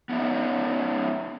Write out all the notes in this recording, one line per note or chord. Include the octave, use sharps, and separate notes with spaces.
B3 C#4 D#4 E5